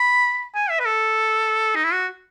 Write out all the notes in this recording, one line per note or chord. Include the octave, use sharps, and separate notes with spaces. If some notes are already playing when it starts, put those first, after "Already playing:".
Already playing: B5
G#5
E5
B4
A4
D#4
E4
F#4